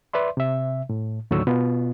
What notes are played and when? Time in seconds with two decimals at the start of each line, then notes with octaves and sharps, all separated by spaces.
0.13 B4 D5 E5 C6
0.37 C3 E5
0.89 A2
1.31 D#2 A2 D3 F#3 C#6 E6
1.47 B2 B3 F4